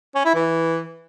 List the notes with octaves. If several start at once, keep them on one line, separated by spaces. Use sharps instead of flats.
C#4
E4
E3